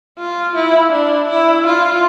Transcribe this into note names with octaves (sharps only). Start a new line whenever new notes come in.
F4
E4
D4
E4
F4